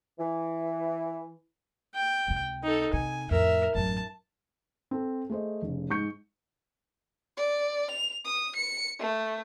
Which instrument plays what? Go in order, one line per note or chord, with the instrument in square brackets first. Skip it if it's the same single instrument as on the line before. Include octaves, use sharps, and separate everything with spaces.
[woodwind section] E3
[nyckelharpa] G5
[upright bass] C#2 C3
[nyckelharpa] D#4 A4
[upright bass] C3 [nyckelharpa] G#5
[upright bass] F2 A2 [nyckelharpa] A#4 E5
[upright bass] A1 F#2 [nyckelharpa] A5
[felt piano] C4 A4
A3 G#4 C5 D#5
F1 C#3
G#2 C#6 G6 C#7
[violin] D5
F7
D#6
C#7
A3